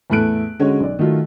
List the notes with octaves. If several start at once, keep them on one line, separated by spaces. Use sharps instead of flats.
E2 A2 A3 A4 F#6 D7
D3 G#3 C#4 F#4 C#5
B1 D5
D#3 F#3 A3 F4